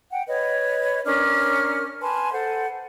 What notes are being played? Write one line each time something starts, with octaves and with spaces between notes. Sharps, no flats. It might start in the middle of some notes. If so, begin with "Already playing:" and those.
F#5 G5
B4 C#5 D#5
C#4 D4 A#4 F6
B4 G#5 A5 C6
A4 C5 F#5